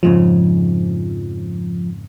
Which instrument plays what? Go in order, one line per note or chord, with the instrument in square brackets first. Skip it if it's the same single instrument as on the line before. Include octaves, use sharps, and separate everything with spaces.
[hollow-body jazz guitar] F2 G#2 C#3 [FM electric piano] F3